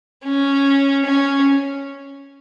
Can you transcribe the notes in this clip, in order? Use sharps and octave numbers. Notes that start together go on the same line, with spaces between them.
C#4
C#4